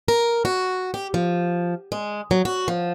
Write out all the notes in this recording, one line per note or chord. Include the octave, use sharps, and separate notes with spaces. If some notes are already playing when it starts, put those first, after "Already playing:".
A#4
F#4
G4
F3
G#3
F#3
F#4
F3